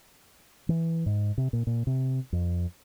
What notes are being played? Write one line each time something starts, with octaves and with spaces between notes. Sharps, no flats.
E3
G#2
C3
A#2
A#2
C3
F2